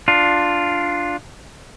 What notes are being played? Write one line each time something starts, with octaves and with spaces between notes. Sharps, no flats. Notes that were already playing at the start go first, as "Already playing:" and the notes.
D4 F4